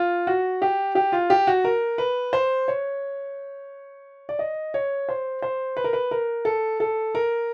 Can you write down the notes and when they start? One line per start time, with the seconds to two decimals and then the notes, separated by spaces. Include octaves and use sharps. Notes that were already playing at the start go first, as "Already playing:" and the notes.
Already playing: F4
0.27 F#4
0.62 G4
0.95 G4
1.12 F4
1.30 G4
1.47 F#4
1.64 A#4
1.98 B4
2.33 C5
2.68 C#5
4.29 D5
4.39 D#5
4.74 C#5
5.09 C5
5.42 C5
5.77 B4
5.84 A#4
5.93 B4
6.11 A#4
6.45 A4
6.80 A4
7.15 A#4